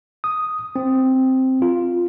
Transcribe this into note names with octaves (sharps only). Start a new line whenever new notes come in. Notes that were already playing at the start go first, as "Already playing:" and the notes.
D#6
C4
F4